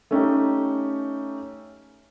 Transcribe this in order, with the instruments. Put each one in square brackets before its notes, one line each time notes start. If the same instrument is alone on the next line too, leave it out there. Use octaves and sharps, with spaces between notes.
[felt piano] A3 C#4 D#4 G4